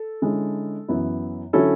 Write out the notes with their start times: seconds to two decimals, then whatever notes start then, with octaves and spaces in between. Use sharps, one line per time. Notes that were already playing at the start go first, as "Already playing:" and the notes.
Already playing: A4
0.22 D3 G#3 C#4 E4
0.88 F#2 E3 B3 E4
1.53 D3 F#3 C#4 E4 A4